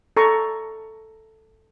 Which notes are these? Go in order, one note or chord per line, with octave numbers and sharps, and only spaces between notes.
A4 A#5 C#6